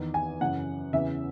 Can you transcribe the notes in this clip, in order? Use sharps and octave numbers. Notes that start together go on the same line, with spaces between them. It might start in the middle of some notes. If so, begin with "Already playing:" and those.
Already playing: E2 D#3
G#5
F#2 C#3 E3 F#5
E2 C#3 E3 E5